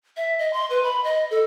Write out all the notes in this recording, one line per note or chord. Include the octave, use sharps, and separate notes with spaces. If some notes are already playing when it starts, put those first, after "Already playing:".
E5
D#5
C6
B4
B5
D#5
A4